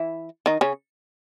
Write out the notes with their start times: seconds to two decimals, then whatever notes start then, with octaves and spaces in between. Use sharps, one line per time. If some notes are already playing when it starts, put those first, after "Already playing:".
Already playing: E3 E4
0.46 D#3 D#4
0.61 C#3 C#4